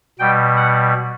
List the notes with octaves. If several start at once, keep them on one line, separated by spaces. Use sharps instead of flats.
B2 G3 G5
F#5